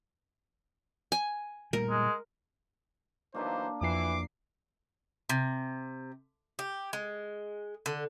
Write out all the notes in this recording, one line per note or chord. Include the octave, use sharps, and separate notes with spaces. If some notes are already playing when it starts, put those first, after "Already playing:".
G#5
A#2 G3 A3 A#4
G#3
E3 F#3 A#3 D4 D#4 C5 A5
A1 F2 E3 F3 D6 C7
C3
G4
G#3
D3